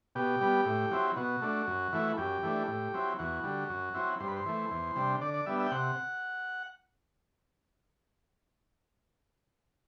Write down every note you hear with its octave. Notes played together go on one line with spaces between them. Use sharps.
B2 G4
G3 B3
A2
F#3 C4 E4
B2 F#4
A3 D4
F#2
E3 A3 E4
F#2 G4
E3 A3 D4
A2
F#3 C4 E4
E2 F#4
D3 G3
F#2
F#3 C4 E4
G2 C5
B4
C5
E3 A3
E2
C3 G3 D4
D3 D5
D5
G3 B3 D4 E5
E5
G5
C3 F#5